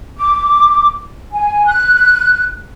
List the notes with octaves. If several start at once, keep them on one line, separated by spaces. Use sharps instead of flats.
D6
G#5
F#6